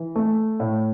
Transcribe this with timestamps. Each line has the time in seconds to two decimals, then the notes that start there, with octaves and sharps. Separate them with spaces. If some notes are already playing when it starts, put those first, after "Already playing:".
Already playing: E3
0.16 A3
0.60 A2